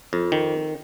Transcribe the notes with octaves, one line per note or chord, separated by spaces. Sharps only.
F2
D#3